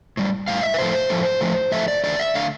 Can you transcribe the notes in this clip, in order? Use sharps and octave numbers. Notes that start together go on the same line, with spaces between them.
A2 G3
A2 G3 F5
E5
B4
A2 F3 A3 C5
A2 F3 A3
A2 F3 A3
A2 F3 A3 E5
D5
E2 D3 A3 D5
E5
D3 A3 F5